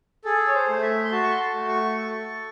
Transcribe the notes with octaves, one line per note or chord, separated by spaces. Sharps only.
G#4 A4
C#5
C5
A3
E5
C6
F#4 A5
C#6
C6
A5
A3
C#6
A4